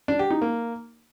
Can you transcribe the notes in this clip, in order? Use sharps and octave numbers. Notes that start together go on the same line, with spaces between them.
D4
G4
D#4
A#3